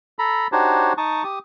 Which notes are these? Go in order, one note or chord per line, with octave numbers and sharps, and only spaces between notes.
A4 A#5 B5
D4 D#4 F#4 G4 C5 C#5
D#4 A5 C#6 D#6
G4 D#6